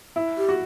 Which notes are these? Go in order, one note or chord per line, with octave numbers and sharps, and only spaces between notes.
E4
G4
F#4